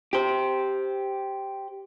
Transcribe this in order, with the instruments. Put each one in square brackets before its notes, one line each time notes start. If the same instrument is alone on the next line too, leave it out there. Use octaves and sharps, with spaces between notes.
[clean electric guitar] G4 C5